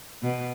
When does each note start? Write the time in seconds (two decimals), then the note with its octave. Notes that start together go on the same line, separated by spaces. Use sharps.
0.23 B2